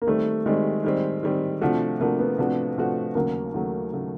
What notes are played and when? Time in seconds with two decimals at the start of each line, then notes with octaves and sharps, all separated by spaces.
0.02 A#3
0.07 D#3 G3 A3 C4
0.46 D#3 G3 G#3 C4
0.84 D#3 G3 C4
1.23 D#3 G3 C4
1.61 C3 F3 A3 D4 F#4
1.99 C3 F3 A3 A#3 D4 F#4
2.19 B3
2.38 C3 F3 A3 D4 F#4
2.77 C3 F3 A3 D4 F#4
3.15 D#2 C#3 F#3 A3 A#3
3.54 D#2 C#3 F#3 A3
3.93 C#3 F#3 A3